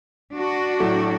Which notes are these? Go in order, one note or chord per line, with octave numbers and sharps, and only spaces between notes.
D4 F#4
A2 F#3 A3